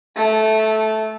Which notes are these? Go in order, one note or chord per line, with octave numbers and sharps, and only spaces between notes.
A3